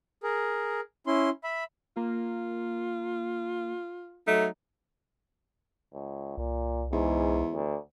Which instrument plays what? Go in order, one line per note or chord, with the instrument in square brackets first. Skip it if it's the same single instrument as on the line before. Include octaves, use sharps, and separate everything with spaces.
[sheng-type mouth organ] G#4 A#4
C#4 E4 C6
E5 B5
[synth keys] A#3 [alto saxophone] F4
[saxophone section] F#3 A3 D#4
[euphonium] C#2
[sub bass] C2 [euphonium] A#2
[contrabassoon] E2 [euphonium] G#2
[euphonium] D2